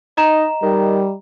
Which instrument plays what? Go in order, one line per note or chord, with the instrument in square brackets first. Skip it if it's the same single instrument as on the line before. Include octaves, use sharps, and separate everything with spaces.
[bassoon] D#4 [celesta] D#5 A#5 E7
[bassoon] D#3 [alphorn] G3